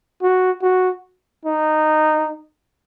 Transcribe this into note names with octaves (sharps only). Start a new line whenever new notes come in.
F#4
F#4
D#4